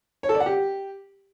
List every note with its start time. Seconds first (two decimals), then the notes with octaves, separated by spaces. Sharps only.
0.23 C#5
0.29 A4
0.35 D5
0.40 F#5
0.46 G4